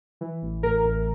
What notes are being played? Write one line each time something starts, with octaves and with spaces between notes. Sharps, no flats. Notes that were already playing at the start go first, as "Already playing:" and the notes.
E3
A1
A2 A#4
A1